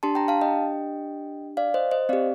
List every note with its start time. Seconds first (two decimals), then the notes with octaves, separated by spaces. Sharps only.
0.03 D4 G4 A5 C6
0.15 G5 A#5
0.28 F5 A5
0.41 D#5 G5
1.57 D5 F5
1.74 C5 D#5
1.91 C5 D#5
2.09 C4 G4 D5 F5